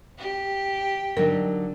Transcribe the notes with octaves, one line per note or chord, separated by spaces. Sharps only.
G4
D3 F#3 D#4 A#4